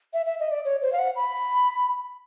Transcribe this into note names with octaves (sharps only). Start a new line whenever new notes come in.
E5
E5
D#5
D5
C#5
C5
F5
F#5
B5